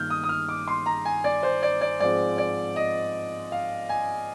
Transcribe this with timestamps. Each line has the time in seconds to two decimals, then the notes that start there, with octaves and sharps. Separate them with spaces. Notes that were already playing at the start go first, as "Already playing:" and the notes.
Already playing: G2 D#3 A#3 F6 G6
0.10 D#6
0.24 D#6
0.29 F6
0.49 D6
0.68 C6
0.86 A#5
1.05 G#5
1.24 D5
1.43 C5
1.63 D5
1.81 D5
2.00 G#2 F3 G#3 C4 D5
2.38 D5
2.76 D#5
3.52 F5
3.89 G#5